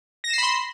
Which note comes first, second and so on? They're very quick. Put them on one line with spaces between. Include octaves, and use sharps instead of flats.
A#6 E7 C7 B5 C6